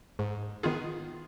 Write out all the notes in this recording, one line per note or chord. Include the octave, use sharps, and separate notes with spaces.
G#2
D#3 B3 F4 G#4